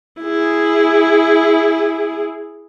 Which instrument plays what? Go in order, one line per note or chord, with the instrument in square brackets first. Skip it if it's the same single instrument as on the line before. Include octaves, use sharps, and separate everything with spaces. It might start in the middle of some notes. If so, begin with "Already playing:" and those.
[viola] E4 G#4